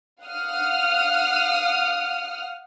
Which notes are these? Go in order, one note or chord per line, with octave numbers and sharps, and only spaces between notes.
F5 F#5 D#6 F6